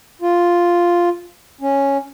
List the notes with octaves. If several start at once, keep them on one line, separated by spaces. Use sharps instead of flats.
F4
C#4